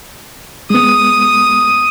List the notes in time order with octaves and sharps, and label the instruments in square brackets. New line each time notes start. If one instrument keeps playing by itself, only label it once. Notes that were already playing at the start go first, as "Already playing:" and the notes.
[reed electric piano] G#3 B3 [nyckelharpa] D#6